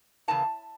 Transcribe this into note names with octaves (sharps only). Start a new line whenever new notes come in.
C#3 E3 A#3 A5